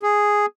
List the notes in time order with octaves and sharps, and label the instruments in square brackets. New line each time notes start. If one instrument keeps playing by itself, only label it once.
[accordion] G#4